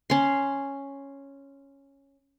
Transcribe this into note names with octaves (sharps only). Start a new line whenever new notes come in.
C#4 C6